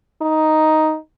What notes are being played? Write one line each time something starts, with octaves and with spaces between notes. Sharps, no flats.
D#4